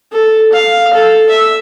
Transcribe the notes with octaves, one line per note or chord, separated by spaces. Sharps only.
A4
F5
A4
E5